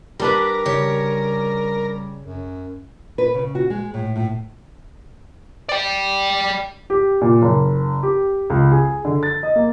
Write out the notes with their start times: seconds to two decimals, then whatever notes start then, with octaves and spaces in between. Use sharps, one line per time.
0.20 G3 D4 G4 A#4 B4
0.65 C#3 G3 G4 C#5
2.22 F#2
3.18 B4
3.34 C#3
3.55 F#4
3.70 G#3
3.94 A2
4.16 A2
5.69 D5 G5
6.90 G4
7.21 A#2
7.42 F#1
8.03 G4
8.50 C#2
8.72 G#4
9.05 D3
9.23 A6
9.43 D#5
9.56 A#3